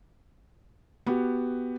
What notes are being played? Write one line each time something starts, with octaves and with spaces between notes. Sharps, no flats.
B3 F#4 G4